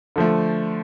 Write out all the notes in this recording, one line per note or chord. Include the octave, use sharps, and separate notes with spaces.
D3 F3 A3